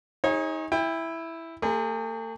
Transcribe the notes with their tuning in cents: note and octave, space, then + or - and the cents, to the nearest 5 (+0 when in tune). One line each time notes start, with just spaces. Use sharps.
D#4 +25 G#4 -20 C#5 -30
E4 +0 G5 +30
A3 +45 G#4 -25 B5 +0